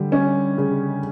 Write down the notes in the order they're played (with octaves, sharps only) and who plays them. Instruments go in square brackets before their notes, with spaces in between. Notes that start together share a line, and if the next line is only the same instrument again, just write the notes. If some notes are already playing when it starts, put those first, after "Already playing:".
Already playing: [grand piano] D3 [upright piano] G3
[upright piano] C#4
C#3